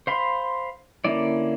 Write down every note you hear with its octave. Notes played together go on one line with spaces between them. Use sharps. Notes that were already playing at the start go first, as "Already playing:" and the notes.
C5 F5 B5 C6
D3 A#3 C#4 E4 D5